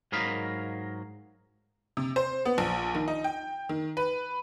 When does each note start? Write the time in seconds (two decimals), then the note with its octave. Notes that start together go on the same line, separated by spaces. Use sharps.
0.12 G#2 F#3 A#4 D#5 F5 B5
1.97 C3
2.16 C5
2.45 B3
2.58 A#1
2.95 D#3
3.08 D#4
3.24 G5
3.69 D#3
3.97 B4